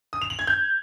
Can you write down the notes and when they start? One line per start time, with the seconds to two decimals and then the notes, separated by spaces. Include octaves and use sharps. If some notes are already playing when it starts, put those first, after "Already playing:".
0.13 D#6
0.21 F7
0.30 F#7
0.39 G#6
0.47 G6